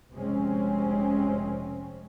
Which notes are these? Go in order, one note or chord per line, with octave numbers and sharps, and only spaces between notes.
F1 C3 G#3 C4 C#4